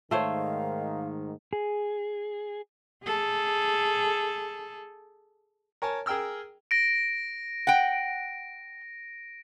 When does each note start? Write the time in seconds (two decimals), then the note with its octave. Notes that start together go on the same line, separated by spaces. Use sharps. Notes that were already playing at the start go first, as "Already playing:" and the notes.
0.11 G#2 D#3 A3 C5 C#5 F5
1.53 G#4
3.05 G#4 A4
5.82 A#4 C#5 G#5 A5
6.06 G#4 A#4 G5 E6 F6
6.71 A#6 D7
7.67 F#5 G5